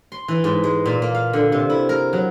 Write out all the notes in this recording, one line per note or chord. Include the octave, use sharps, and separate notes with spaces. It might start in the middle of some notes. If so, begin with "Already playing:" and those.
C6
E3
G#2
G#3
A#2
A#3
F5
D3
C3
E4
A#4
F#3